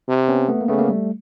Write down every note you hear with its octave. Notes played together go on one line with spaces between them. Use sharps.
C3
B3 C#4
A3 B3
A#3
C#3 A3 B3
A#3
G3 A3